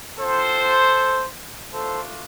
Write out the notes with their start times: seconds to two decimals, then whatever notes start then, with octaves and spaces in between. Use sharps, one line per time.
0.19 C4 F4 A4 C5
1.71 A3 D4 F4 A4 C5